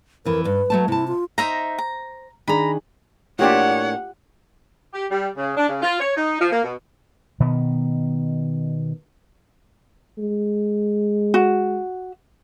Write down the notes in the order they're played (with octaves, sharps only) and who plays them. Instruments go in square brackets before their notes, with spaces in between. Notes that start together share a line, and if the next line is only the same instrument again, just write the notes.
[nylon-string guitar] F2 E3 [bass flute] A#4
[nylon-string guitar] G2 [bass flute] B4
[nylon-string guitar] F#3 A3 A5
[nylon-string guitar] C3 A5 [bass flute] E4
[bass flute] F4
[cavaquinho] D#4 E5 A#5 [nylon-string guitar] C5
[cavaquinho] A#5
[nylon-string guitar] D#3 D4 G#4 [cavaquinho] A#5 B5
[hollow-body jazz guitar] A2 A#3 D4 [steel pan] F4 G4 [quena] C#5 [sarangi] F#5
[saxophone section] G4
G3
C#3
D4
C#3
F4
C#5
D#4
F3
A#3
B2
[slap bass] B2 D#3 B3
[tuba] G#3
[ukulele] F#4